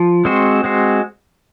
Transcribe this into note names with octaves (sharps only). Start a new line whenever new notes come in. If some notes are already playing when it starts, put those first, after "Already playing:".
Already playing: F3
G#3 C4 F#4 C5
G#3 C4 F#4 C5